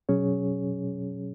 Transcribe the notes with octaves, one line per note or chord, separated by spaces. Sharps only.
B2 F#3 C#4 G#4 C#5